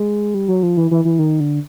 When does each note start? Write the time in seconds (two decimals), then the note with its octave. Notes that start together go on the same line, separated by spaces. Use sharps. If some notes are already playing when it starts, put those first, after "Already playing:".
Already playing: G#3
0.34 G3
0.48 F#3
0.63 F3
0.77 E3
0.91 E3
1.05 E3
1.19 D#3
1.40 D3